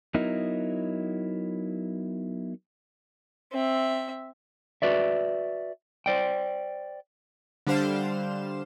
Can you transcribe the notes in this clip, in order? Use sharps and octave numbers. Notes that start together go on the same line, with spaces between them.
F#3 B3 D#4 E4 A#4 D#5
C4 E5
F#4 B4 D5 E5
C5 D5 G5
D3 G3 D4 C5 F5 E7